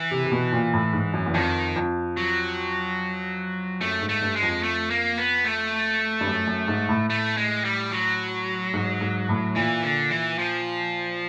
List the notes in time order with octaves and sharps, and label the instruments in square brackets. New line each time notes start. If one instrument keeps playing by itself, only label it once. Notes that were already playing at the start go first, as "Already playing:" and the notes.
Already playing: [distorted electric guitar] E3
[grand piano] C3
C3
B2
A#2
A2
G#2
F#2
E2
[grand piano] F2 [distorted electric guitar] D#3
[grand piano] F2
[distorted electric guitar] F#3
[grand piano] F#2 [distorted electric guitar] A3
[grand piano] G#2
[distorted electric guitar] A3
[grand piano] G2
[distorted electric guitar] G#3
[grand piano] F2
[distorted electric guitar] A3
A#3
B3
A3
[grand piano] G2
F#2
F#2
G#2
A2
[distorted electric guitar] A3
G#3
G3
F#3
[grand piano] G#2
G#2
A2
[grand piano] A#2 [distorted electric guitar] E3
[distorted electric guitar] D3
E3
F3